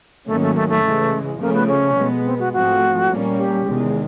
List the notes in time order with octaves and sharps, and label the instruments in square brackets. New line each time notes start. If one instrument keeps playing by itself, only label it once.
[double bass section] G#2 D#3 F#3 A#3 C#4 [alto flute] A3
[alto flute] A3
A3
A3
[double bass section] C#3 E3 G#3
[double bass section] C#3 F3 A3 [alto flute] A#3
[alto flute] B3
C#4
[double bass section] B2 G#3 B3
[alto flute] C4
F#4
[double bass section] G#2 F3 A3 C4 [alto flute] F#4
[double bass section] A#2 G3 A#3 C#4
[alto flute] G4
[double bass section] E2 C3 D#3 G#3